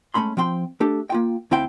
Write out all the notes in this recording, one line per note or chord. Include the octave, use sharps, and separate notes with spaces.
G#3 A3 C#4 B5 C6
F3 C4 G5 C6
A3 D4 G4 A4
A#3 F4 G5
D2 C4 E4 F5 G5